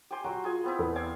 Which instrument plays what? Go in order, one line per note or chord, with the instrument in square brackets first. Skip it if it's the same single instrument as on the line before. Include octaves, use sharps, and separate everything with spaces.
[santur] G4 G#5 C6
[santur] F#3 C6 [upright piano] F#4
[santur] F4 G#4 G#5
B3 C4 E4
[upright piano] E2 A4 B4
[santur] D5 F5 G#5